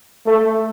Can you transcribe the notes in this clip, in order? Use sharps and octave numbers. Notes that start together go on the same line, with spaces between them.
A3